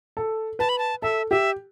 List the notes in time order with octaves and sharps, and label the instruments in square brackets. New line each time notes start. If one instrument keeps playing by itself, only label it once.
[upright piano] A4
[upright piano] B4 [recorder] A5
[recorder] B5
A5
[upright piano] A4 [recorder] E5
[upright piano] G4 [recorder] E5